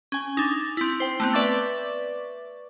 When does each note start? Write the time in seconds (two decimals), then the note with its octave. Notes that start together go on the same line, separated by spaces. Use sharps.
0.12 C#4 G#5
0.37 D4 D#4
0.77 C4 E4
1.00 C5 G5
1.20 A3 B3 C4
1.33 B4 D5 E5 C#6 D6 A6